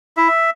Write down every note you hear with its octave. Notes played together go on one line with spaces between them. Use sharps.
E4 E5